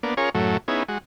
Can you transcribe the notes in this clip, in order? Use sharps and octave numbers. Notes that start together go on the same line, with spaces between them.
A#3 B3 D4
C#4 F4 G#4 A#4 C#5
F#2 A2 F#3 A3
B3 C#4 D#4 E4 G#4
G#3 F#4